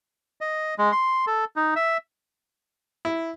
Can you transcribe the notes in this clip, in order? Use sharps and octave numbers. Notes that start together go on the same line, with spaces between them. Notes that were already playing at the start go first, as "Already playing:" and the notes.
D#5
G#3
C6
A4
D#4
E5
E4